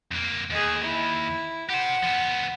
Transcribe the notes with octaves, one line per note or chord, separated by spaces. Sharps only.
F2 A#3
D#2 G#3 G#4
E4
G4 C5 F#5
F3 B3